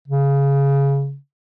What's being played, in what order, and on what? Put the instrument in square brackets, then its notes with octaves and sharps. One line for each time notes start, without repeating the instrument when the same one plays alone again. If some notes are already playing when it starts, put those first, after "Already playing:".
[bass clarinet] C#3